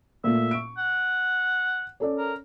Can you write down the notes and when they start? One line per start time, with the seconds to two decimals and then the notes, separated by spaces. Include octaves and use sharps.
0.24 A#2 A3 E5
0.51 C#6 D7
0.77 F#5
2.00 C#4 A4 D5
2.18 A#4